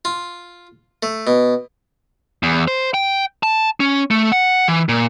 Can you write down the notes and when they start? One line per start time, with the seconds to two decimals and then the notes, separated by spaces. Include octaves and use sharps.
0.05 F4
1.03 A3
1.27 B2
2.43 E2
2.68 C5
2.94 G5
3.43 A5
3.80 C#4
4.11 A3
4.32 F#5
4.68 E3
4.89 A#2